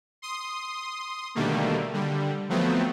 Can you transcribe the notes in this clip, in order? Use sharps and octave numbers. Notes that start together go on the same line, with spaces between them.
C6 D#6
B2 D3 D#3 G3 A3 A#3
D3 G3
F3 F#3 A3 B3 C4